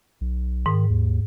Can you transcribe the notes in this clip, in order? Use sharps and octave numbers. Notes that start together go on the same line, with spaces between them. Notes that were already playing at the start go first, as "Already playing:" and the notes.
B1
G#2 D#3
D#2